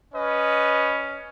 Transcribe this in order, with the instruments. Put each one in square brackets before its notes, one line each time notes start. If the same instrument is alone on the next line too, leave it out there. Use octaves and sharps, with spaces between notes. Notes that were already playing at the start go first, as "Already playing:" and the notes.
[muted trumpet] C#4 [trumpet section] B4 D#5